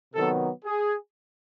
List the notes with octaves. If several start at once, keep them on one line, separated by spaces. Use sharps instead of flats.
C3 D#3 F#3 B3 A4
G#4